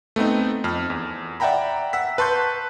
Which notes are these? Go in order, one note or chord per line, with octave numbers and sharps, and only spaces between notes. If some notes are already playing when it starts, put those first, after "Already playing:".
A3 B3 C4 D#4
F2 F6
E2
D5 E5 F#5 G5 A#5 B5
F#5 E6 B6
B4 A5 C6 C#6 G6